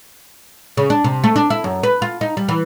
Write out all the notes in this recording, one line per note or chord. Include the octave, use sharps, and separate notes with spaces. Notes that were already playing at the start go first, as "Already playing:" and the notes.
C#3
D4
C3
A3
D4
E4
F#2
B4
F4
D#4
G3
E3